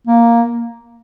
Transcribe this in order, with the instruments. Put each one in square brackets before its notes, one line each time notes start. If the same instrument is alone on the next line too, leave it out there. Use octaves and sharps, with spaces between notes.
[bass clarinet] A#3